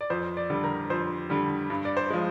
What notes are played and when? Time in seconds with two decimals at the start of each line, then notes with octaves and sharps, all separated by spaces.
0.01 D5
0.10 F2 C5
0.37 D5
0.50 D3 G3
0.64 A#4
0.90 F2 C5
1.30 D3 G3
1.70 G2
1.85 D5
1.97 C5
2.10 F3 G#3